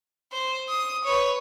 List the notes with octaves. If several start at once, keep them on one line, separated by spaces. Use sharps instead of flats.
C5
D#6
B4 C#5